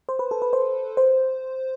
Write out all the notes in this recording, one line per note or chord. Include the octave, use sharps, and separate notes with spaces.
C5
B4
A4
B4
C5
C5